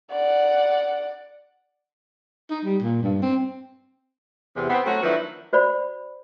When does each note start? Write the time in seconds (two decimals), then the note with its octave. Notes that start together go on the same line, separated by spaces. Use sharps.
0.12 D5 F#5
2.50 D#4
2.65 G3
2.82 A#2
3.03 G2
3.22 C4
4.56 E2 C3
4.69 B3 C4
4.85 F#3 A3 C4 C#4 F#4
5.02 D#3 F3 F#3 B3 D4 E4
5.53 F#4 C5 D5 B5